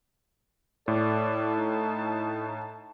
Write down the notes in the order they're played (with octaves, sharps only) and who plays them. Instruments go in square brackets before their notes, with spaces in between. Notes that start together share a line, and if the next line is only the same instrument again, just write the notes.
[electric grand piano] A2 [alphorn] A4 [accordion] D5 [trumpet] A5
[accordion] D#4